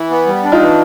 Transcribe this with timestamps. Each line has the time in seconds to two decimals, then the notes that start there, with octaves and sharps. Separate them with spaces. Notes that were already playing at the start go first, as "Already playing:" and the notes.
Already playing: E3
0.10 B3
0.27 G3
0.44 D4
0.52 D#4 F4
0.60 E3